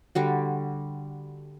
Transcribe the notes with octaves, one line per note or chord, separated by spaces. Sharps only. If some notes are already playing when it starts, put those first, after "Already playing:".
D3 G3 F#4